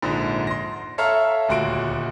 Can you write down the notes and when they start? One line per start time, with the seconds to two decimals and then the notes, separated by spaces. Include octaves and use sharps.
0.02 A#1 G#2 D3
0.47 C6 A#6
0.98 A4 C#5 E5 F5 A#5 F6
1.49 D#1 D2 F#4 C6 D7